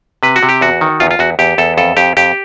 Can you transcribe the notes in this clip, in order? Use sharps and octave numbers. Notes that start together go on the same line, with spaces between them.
C3 B4
F#4
C3
G4
E2 F#4
D#3
E2 F4
F4
E2 F#4
E2 G4
E2 A4
F2 A4
F2 G4
F2 G4